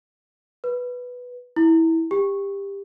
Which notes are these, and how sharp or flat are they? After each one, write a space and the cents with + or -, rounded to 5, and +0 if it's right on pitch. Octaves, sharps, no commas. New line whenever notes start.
B4 +0
E4 -15
G4 +20